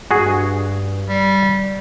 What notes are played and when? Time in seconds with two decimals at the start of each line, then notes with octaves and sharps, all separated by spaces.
0.11 G2 F#4 G#4
1.08 G3